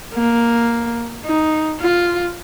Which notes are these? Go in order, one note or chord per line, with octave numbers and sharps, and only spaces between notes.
A#3
D#4
F4